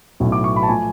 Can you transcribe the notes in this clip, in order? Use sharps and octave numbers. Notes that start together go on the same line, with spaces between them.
B1 A2 F#3 A3
D6
C#6
B5
A5
F3 A3 G#5